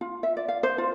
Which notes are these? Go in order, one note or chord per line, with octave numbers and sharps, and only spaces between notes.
F4
E5
D5
F5
C5
F4